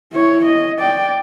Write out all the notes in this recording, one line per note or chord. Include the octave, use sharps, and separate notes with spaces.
E4 C#5
D#5
D5 G5